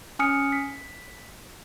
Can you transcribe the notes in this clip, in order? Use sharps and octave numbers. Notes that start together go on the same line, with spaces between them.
C#4 G#5 D#6 F6 C#7
B6